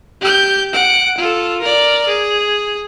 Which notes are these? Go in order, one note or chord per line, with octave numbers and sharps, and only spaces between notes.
G4 G6
F#5 D7
F4 A4
A#4 D5
G#4